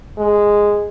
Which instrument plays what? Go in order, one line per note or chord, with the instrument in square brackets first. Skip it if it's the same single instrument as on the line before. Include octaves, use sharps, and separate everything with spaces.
[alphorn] G#3